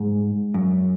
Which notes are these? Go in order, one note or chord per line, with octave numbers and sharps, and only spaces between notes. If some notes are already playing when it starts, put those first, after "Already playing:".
Already playing: G#2
F#2